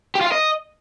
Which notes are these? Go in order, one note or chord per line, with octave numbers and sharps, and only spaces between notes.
G4
F4
F5
D#5